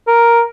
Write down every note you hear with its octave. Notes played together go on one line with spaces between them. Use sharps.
A#4